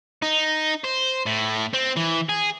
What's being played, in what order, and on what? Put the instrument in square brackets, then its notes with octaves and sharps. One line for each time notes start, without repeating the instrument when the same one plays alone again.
[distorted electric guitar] D#4
C5
A2
C4
E3
G#4